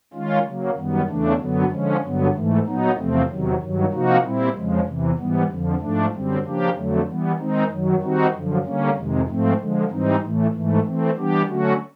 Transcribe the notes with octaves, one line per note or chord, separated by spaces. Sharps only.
D#3 G#3 C#4 F4
C#3 F#3 A#3
F#2 D#3 G3 B3
E2 C#3 E3 A3 D4
F#2 D3 F#3 B3
D3 F3 G#3 C#4
G2 D3 F#3 B3
G#2 E3 A3
A#2 F#3 B3 D#4
E2 C3 F3 A3 C4
E2 C3 D#3 F#3
G2 D#3 F#3
C3 F3 A#3 D#4 F#4
A#2 G3 C4 E4
F2 C#3 F3 G#3
E2 C3 E3
G#2 E3 G3 B3
F2 D3 F3
G#2 F3 A3 D4
F#2 D3 G3 C4
C#3 F3 A#3 D4 G4
F2 D3 F#3 A3
E3 G3 B3
D#3 G#3 C4 D#4
F#2 D#3 F#3
D#3 G3 C4 D#4 F#4
F#2 D3 F3
D3 G3 A#3 C#4
F2 C3 D#3 G#3
G#2 F3 A3 C4
D3 F3 G#3
G#2 E3 G3 C4 D#4
A2 E3 A3
G#2 E3 A3
E3 A3 C4
E3 G3 B3 D4 G4
D3 F#3 A3 C#4 F#4